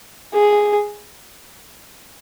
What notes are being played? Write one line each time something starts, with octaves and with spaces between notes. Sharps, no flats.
G#4